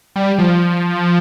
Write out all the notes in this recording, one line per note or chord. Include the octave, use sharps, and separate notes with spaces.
G3
F3